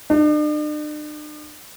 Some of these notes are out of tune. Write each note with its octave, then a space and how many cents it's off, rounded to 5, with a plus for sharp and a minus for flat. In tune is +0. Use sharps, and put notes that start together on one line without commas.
D4 +45